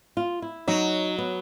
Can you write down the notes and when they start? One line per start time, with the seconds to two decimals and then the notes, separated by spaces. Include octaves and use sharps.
0.17 F4
0.42 E4
0.68 F#3 D#4
1.18 B3